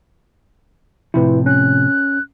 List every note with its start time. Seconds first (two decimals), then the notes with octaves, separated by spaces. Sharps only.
1.14 A2 C3 F3 E4 B4
1.46 C#4 F#6